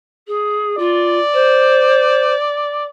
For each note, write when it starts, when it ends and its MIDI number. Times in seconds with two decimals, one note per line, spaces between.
0.27 0.76 68
0.78 1.19 65
0.78 2.87 74
1.33 2.33 72